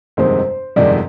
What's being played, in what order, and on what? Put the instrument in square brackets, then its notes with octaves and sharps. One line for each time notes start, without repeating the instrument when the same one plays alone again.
[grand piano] G1 F2 C3 D#3 G#3 [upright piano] C5
[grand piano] G1 F2 C3 D#3 G#3 [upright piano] D5